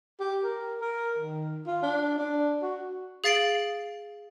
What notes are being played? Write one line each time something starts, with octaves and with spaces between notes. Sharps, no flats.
G4
A#4
A#4
D#3
F4
D4
D4
F#4
G#4 F5 A6 C7 D7 F#7